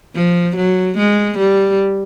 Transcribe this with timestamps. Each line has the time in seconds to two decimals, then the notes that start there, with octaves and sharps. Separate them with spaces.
0.15 F3
0.56 F#3
0.98 G#3
1.38 G3